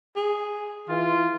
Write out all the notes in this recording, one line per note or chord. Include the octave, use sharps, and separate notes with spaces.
G#4
E3 F4